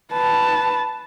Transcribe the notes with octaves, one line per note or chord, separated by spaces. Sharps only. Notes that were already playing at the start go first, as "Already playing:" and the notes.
B4 A5